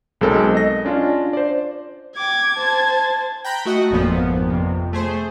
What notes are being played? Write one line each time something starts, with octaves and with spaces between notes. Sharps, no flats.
B1 G#3 C4 A4 A#4
D#5 A#6
C#4 D4 F4
C5 D5
G5 D6 G#6
C5 A5
G5 A#5 B5 F#6 G6
A3 F#4 D#5 F#5
G#1 F2 A#2 F3 B3
F2 C3
A3 G#4 C5